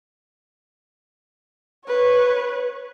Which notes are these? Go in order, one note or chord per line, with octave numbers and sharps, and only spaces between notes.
B4 C#5